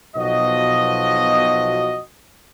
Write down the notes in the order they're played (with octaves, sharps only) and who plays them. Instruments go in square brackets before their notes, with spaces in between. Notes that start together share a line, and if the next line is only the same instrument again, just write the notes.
[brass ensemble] B1 B2 F3 F#4 D#5